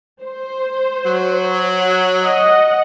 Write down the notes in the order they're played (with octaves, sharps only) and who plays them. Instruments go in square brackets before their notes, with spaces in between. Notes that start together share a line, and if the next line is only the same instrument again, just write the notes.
[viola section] C5
[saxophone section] F#3
[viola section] D#5 F#5